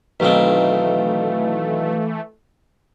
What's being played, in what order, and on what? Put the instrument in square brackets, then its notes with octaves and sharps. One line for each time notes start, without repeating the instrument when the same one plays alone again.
[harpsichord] B1 D#3 C4 [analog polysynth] E3 A3 [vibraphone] B4 F5